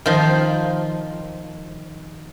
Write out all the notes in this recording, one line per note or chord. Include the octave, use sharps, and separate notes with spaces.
D#3 F3